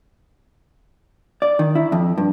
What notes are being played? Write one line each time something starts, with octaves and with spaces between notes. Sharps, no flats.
D5
D#3
E4
F2
G2